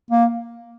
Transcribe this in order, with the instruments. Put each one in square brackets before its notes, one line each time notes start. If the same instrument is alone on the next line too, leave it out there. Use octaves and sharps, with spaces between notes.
[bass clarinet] A#3